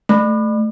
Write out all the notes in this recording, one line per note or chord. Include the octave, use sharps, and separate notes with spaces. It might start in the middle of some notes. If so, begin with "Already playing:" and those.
A3